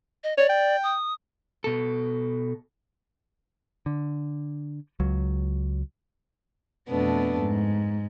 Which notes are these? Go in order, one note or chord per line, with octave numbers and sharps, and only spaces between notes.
D#5
C#5 D5
G5
D#6
B2 A4
D3
C#2 F#3
F2 B2 A3 B3 D4
G#2